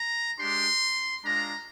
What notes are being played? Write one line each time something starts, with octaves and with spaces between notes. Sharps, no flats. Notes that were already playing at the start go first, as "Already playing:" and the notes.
Already playing: A#5
G#3 D4 G4 C6
G#3 D4 F4 A#5